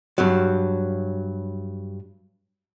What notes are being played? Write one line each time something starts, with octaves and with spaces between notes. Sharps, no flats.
G2 F#3